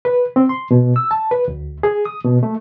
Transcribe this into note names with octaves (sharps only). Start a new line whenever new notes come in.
B4
C4
C6
B2
E6
A5
B4
D2
G#4
D#6
B2
A3